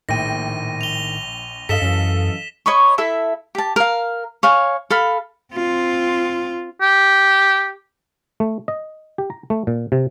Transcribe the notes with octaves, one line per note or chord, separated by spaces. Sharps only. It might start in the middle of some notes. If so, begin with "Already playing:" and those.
A#1 A2 D#3 G5 A#6 D#7
F7 G7
G2 A4 D#5 F5 B6 E7 G7
F#2 E3 F#3 C#4
C#5 D#5 B5 C#6
E4 A4 E5
G4 A5
A#4 F5
C#5 F5 G#5
A4 F5 B5
C4 F4
G4
A3
D#5
G4
A#5
A3
A#2
C3